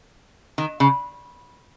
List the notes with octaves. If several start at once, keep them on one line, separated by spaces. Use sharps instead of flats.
D#3
C#3